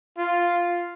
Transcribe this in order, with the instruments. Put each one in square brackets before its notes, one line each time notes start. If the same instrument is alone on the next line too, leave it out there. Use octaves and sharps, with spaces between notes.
[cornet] F4